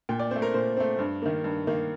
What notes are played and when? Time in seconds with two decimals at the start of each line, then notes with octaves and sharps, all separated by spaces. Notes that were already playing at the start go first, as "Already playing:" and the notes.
0.09 A#2 G5
0.19 D5
0.31 A3 C4 C5
0.42 A#4
0.54 A#2 C5
0.77 A3 C4
0.99 G2
1.22 D#3 A#3
1.44 G2
1.67 D#3 A#3